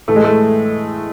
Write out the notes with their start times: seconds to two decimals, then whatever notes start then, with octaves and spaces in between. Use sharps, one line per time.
0.08 A2 E3 A3
0.16 G#3
0.24 A3